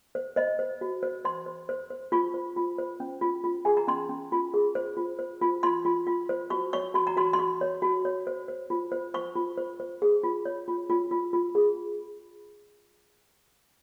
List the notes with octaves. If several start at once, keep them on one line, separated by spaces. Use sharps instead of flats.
C5
C5 D#5
C5
F#4
C5
C5 C6
C5
C5
C5
F4 C#6
C5
F4
C5
C#4
F4
F4
G#4 G#5
A#5
C#4 C6
C#4
F4
G#4
C5
F4
C5
F4
F4 C6
F4
F4
C5
F#4 C#6
C#5 C#6
F#4 C6
A#5
F#4 C6
C6
F#4 C#6
C#5
F#4
C#5
C5
C5
F4
C5
C5 C#6
F4
C5
C5
G#4
F4
C#5
F4
F4
F4
F4
G#4